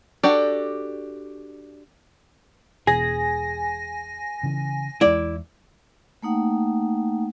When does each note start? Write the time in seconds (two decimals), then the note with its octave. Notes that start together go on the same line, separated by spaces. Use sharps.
0.23 D4 F#4 G4 A4 D5
2.87 E1 B2 E3 G#4 G#5 A#6
4.43 C#3 E3
5.01 E2 G#3 E4 D5
6.22 A3 A#3 D#4 F#5 G5